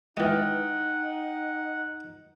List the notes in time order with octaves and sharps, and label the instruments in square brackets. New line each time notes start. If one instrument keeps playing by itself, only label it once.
[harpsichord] E3 G#3 [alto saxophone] D#4 [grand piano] D#5 G5 F6 [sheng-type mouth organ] F#5